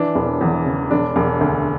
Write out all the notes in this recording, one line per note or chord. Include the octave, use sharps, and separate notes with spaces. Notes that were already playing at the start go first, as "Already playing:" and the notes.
Already playing: E3 D4
E1
E2
C#3
E1 D4
E1
D2